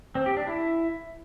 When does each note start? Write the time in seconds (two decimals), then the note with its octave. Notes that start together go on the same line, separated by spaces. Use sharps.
0.15 C4
0.26 G4
0.37 D4
0.47 E4